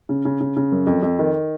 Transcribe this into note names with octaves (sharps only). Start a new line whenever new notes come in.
C#3
C#3
C#3
C#3
F#2
F2
F2
D#3